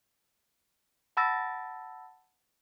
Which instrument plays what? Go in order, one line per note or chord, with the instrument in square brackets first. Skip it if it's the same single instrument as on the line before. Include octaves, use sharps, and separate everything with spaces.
[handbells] F#5 A5 B5 E6 A6 A#6